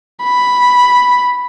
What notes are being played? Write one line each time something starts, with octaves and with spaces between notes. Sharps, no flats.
B5